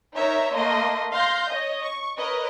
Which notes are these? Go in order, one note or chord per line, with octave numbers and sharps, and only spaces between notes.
D#4 A#4 C#5 E5 A#5
A3 A#3 D#5 C6
F5 C6 G6 A#6
C#5 D#5
C#6
A#4 B4 C#5 D#5